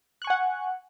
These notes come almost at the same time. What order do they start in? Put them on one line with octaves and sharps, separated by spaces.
F#6 C#6 G#5 F#5